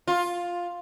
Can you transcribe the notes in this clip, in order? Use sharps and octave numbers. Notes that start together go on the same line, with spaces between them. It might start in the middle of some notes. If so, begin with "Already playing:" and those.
F4